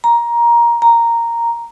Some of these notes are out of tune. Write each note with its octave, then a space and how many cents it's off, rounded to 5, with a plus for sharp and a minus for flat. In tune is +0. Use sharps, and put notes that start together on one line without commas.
A#5 +15
A#5 -5